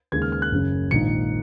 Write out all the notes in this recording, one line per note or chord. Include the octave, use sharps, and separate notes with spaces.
D#2 C#3 G#3 G#6
F6
F6
F#6
F#1 F#2 C#3
A#1 G#2 D#3 A#3 D#4 C#7